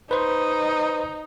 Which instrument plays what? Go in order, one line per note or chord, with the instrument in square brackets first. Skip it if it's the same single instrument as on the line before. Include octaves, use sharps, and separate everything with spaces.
[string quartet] D#4 [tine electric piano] B4 C5